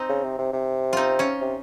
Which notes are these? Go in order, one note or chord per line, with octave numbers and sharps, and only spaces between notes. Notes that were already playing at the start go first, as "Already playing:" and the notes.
Already playing: C4 D#4
C#3
C3
C3
C3
C4 D#4 F4
C#4 F4
C3